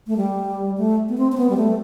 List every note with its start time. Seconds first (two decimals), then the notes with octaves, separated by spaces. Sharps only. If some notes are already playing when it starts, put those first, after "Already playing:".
0.07 A3
0.17 G3
0.78 A3
1.09 B3
1.17 C4
1.32 C4
1.37 B3
1.50 G3
1.57 A3